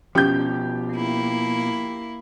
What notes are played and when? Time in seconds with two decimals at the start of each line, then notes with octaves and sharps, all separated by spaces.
0.15 B2 F3 C#4 G4 G6
0.93 A#3 E4